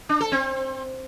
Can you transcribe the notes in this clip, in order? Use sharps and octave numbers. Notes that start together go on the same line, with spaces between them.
D4
A4
C4